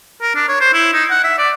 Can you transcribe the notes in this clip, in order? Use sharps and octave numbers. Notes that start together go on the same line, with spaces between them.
A#4
D4
C#5
C5
E4
D#4
F#5
E5
D5